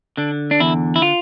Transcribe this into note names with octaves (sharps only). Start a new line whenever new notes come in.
D3 D4
D4
E2 E4
E4
F4